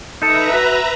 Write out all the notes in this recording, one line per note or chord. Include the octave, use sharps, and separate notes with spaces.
D#4 A4 B4 E5 A#5
F#4